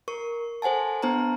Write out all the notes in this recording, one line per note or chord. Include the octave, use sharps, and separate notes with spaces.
A#4 C#6
A4 C5 F#5 G#5 A5
B3 D4 C5 A5 A#5